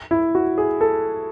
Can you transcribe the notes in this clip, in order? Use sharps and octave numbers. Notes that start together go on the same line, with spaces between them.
E4
F#4
G#4
A4